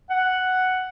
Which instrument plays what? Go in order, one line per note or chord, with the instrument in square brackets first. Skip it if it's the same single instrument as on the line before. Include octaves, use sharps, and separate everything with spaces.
[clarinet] F#5